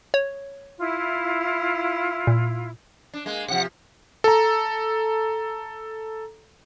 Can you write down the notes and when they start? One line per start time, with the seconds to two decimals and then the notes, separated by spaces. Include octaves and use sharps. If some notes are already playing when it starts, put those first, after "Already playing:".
0.14 C#5
0.78 E4 F4
2.27 A#2
3.14 D4
3.26 G#3 A#3
3.49 C3 F3 F#5
4.24 A4 A#5